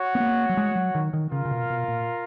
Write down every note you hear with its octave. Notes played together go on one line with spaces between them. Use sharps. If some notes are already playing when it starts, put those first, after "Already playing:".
Already playing: F#4 C#5 F#5
B3
A#3
F#3
G#3
F#3
D#3
D#3
C#3 F4 A#4 F5
C#3
B2
B2
A#2